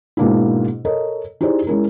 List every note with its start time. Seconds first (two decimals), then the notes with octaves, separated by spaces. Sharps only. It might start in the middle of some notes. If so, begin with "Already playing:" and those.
0.17 G#2 B2 G#3 A#3 D4 E4
0.85 A4 A#4 C#5 D#5
1.41 D#4 E4 G4 G#4 C5 D5
1.67 G#3 C#4 E4 G#4 A#4